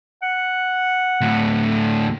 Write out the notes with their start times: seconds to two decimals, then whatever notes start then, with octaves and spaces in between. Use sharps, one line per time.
0.22 F#5
1.21 D2 A2